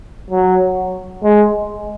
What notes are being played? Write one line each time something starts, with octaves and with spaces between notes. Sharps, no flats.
F#3
G#3